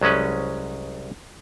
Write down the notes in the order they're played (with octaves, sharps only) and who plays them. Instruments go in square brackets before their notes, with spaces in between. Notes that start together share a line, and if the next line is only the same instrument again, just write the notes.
[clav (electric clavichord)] C2 F#3 G#3 C#4 B4